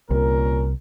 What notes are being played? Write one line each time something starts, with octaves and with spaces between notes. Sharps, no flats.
C2 A#2 C#4 A#4